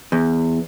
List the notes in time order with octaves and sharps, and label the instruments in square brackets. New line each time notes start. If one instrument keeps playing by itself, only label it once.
[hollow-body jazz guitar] E2